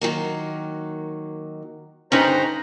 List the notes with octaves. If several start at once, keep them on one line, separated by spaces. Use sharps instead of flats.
D#3 F#3 A#3
G2 D3 C#4 D#4 B4 C5 A#5